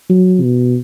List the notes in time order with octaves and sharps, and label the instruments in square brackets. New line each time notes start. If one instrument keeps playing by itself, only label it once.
[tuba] F#3
B2